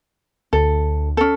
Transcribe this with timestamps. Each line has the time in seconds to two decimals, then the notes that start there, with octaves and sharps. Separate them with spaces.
0.53 D2 A4
1.17 C#4 A4